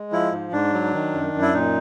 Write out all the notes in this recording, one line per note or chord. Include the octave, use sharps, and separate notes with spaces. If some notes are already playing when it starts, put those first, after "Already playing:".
Already playing: G#3
F3 E4
G#2
G#2 D4
F#3
D#3
F#2
F#2
E4
A#2 D#4